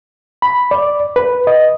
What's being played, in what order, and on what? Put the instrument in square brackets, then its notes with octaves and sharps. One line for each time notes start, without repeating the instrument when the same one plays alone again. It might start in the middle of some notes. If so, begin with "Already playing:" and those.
[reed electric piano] B5
D5
B4
D#5